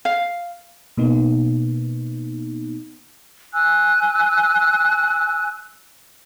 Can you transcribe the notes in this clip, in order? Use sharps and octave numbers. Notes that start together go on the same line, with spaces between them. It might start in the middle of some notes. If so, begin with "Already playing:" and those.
F5
B2 A#3 B3 D#4
G#5 E6 F#6